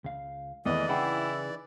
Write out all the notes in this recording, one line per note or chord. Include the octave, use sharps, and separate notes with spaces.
C#2 F5
E2 D#3 E3 G#3 A3 D5 D#5
C#3 D#4 E4 G#4 F#5 G5 B5